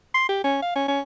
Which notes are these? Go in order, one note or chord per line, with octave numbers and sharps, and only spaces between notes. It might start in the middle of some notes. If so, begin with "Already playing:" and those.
C6
G4
C#4
F5
C#4
C#4